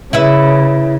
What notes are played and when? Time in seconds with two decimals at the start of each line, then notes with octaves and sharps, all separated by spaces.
0.13 C#3 E4 B4 E5